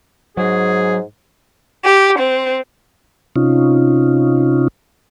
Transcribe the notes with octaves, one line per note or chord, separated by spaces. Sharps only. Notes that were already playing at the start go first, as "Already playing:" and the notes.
G#2 F#3 G#4
G4
C4
C3 C#4 D#4 F4